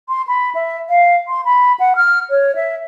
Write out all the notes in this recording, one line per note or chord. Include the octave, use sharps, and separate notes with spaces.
C6
B5
E5
F5
C6
B5
F#5
F6
C#5
E5